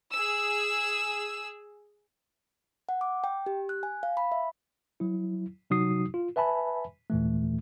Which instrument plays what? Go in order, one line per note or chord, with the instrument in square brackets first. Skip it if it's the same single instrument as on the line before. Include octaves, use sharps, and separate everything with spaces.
[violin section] G#4 E6
[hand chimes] F#5
D6
G5
G4
F#6
G#5
F5
B5
E5
[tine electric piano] F#3 E4
C3 F#3 D#4 F#4 D#6 C7
F4
B4 E5 G#5 A5 B5
D#2 A#2 E3 A3